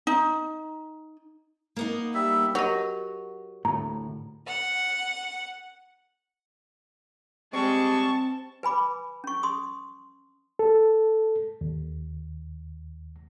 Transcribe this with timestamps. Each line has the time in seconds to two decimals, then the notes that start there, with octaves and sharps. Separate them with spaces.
0.07 D#4
1.76 A#3 B3 D#4
2.14 G3 E5
2.55 F#3 G4 A#4 D#5
3.65 D2 A2 A#5
4.47 F#5
7.53 G3 G#3 C4 A5 C#6
8.63 B4 G#5 B5 D6
9.24 C#4 C#6
9.43 C6 D#6
10.59 A4
11.61 D#2